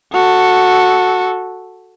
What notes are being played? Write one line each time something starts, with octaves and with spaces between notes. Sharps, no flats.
F#4 A4